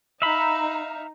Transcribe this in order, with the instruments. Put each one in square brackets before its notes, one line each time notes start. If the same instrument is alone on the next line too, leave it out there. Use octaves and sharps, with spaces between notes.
[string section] D#4 [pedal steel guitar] E5 F5 B5